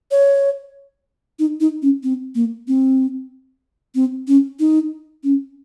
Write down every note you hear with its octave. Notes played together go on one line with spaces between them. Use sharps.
C#5
D#4
D#4
C#4
C4
A#3
C4
C4
C#4
D#4
C#4